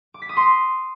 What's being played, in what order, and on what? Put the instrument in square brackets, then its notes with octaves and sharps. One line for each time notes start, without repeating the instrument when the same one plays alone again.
[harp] D6
B6
D#6
C6